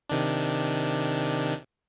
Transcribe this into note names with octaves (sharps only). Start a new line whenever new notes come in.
C3 D#3 D4